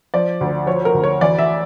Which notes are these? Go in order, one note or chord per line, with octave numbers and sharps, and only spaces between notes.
F3 D5
D2
F3 C#5
A#4
D2
C#5
E3 D5
E5